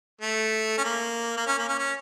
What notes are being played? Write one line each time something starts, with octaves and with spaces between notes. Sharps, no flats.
A3
C#4
A#3
A#3
C#4
A#3
C#4
C#4